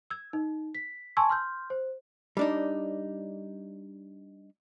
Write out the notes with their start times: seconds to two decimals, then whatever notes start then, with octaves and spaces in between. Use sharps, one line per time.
0.10 E6 G#6
0.33 D#4
0.75 B6
1.17 G#5 A5 C6 C#6 E6 G#6
1.30 C6 F6 G6
1.70 C5
2.37 G3 D4 D#4